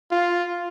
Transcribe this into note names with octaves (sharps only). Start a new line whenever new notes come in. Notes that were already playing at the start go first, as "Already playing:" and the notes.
F4